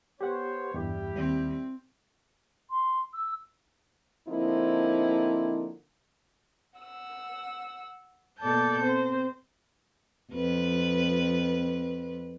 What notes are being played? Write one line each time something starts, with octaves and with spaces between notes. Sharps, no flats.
B3 G4 C5 C#5 F#5
E2 G2 G3 E4 G4
D#2 C4
C6
E6
D3 F3 A#3 C4 D#4 E4
F#5 E6
B2 A#3 A4 D5 A5 G6
C4 C5
F2 B4